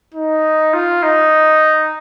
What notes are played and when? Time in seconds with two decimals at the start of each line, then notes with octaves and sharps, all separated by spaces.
0.14 D#4
0.74 F4
1.03 D#4